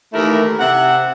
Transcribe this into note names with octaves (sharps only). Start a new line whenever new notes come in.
D#2 E3 A3 E4 A#4
C3 E5 F#5